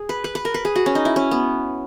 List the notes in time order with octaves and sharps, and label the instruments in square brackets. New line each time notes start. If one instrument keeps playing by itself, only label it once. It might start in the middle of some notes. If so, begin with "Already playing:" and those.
Already playing: [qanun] G#4
B4
B4
B4
A#4
B4
G#4
F#4
C#4
D#4
E4
C#4
B3